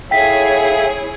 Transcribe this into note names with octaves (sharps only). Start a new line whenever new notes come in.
E4 G#4 A4 C#5 E5 F5 G5 B6